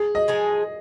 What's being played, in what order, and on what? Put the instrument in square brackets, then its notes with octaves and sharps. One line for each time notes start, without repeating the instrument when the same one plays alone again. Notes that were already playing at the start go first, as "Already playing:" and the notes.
Already playing: [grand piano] G#4
D#5
[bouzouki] F3 G#3 D#4 G#4